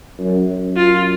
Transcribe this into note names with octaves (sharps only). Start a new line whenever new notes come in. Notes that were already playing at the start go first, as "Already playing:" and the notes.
F#2
F#2
F4